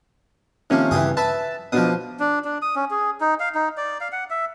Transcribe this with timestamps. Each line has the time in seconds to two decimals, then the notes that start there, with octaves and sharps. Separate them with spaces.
0.70 C3 D#3 F3 A#3 C#4
0.91 G2 C#3 E3 G4 G#4
1.17 B4 E5 A5 B5 E6
1.72 B2 F3 D4 D#6
2.20 D4
2.45 D4
2.62 D#6
2.76 C#4
2.91 G#4
3.21 D#4
3.40 F5
3.55 D#4
3.77 D5
4.01 F5
4.12 F#5
4.30 E5